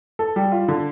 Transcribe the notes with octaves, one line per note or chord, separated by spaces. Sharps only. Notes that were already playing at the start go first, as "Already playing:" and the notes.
A4
G3
F4
D3